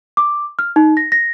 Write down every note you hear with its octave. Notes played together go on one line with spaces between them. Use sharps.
D6
F6
D#4
A#6
A#6